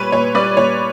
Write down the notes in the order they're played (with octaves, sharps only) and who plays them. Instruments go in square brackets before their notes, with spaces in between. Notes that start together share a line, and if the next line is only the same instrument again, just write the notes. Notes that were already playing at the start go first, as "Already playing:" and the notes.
Already playing: [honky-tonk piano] A#2 G3 B4 C#5
A#2 C#5
G3 B4 D5
A#2 C#5